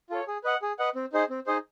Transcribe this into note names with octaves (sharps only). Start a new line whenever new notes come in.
F4 A4 C#5
G#4
B4 D#5 F#5
G#4
B4 D#5 F#5
C4
D#4 G#4 C5 D#5
C4
D#4 G#4 C5 D#5